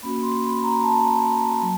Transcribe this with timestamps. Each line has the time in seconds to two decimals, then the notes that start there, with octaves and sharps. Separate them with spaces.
0.03 A#3 C#4 F#4 B5
0.22 C6
0.43 B5
0.63 A#5
0.83 A5
1.62 F#3